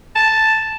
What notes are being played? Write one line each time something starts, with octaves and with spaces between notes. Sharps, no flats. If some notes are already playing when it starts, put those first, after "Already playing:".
A5